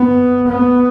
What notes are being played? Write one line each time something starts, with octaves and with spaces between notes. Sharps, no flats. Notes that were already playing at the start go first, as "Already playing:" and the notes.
Already playing: B3
B3